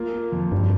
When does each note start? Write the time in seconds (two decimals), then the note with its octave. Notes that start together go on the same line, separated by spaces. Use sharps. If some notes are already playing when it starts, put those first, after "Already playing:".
Already playing: A#3 F4
0.13 A#3
0.32 F2
0.52 G2 G3